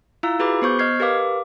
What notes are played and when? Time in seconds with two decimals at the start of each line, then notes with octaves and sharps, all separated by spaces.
0.23 E4 F4 F5 A#5 E6
0.39 F#4 G#4 B4 B5 D6
0.62 B3 C5 C#6 G6
0.79 D#5 F6 G#6 C7
1.00 G4 A#4 B4 F5 D6